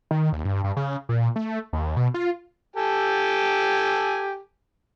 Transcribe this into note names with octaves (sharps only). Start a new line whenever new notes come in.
D#3
D#2
G2
G2
C#3
A#2
A3
D#2
B2
F4
G4 A4 G#5